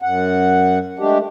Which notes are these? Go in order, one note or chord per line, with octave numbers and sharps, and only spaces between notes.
F#2 F#5
G#3 A3 D4 G4